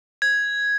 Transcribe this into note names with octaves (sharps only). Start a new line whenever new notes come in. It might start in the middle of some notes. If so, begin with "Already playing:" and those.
G#6